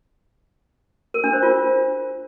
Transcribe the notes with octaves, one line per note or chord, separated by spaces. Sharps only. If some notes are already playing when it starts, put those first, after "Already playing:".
A#4
D4
C5
F4